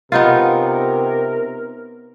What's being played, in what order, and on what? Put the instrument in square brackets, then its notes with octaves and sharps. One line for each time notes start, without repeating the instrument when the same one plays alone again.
[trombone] C3 [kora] B3 D#4 F4 [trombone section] A#4